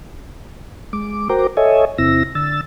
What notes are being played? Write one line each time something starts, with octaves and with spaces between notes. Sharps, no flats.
G#3 D6
F#4 A#4 C5 G5 A#5 D6
A4 C#5 D#5 E5 G#5
E2 C3 C4 E4 E6 A#6
D3 E6 A6